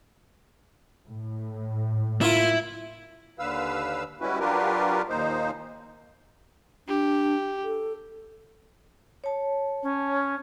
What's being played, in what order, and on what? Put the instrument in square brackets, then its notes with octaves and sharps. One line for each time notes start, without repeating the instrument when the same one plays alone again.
[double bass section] A2
[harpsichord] A#3 F4 [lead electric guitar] E4
[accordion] D#2 D3 B4 F5 E6
G3 G#3 C#4 E4 F#4 B4
F#3 D4 F4 G4 A#4 B4
D#2 A#2 D#4 C5
[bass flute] D4 [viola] G4
[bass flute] A4
[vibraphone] C#5 A5
[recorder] C#4